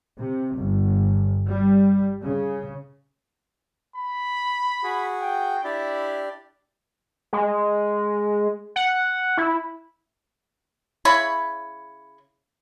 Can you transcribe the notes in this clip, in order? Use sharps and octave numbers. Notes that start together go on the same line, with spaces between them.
C3
G1
G3
C#3
B5
F#4 G#4
G5
D4 E4 G4 D5
G#3
F#5
E4
C#3 E4 C#5 B5